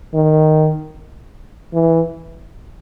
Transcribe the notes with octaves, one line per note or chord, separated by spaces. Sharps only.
D#3
E3